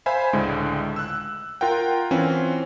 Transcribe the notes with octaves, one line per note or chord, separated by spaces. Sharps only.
C5 E5 F5 G#5 B5
C#2 A2 D3 G#3
E6 F#6
F4 A#4 F#5 G5
E3 C4 C#4 F4